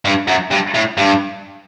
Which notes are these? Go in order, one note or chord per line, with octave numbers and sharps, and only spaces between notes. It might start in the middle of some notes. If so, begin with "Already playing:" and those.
G2
F#2
G2
A2
G2